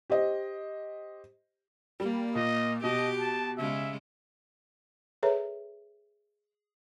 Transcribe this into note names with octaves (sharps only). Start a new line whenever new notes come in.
G4 C5 D#5
G3 A#3
A#2 D#5
B2 G4 D#5
A5
C#3 G#3 E5
G#4 A4 B4 C#5 E5 A#5